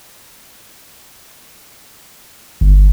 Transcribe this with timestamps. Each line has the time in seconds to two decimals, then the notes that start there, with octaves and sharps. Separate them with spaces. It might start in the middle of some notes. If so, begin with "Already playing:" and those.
2.61 G1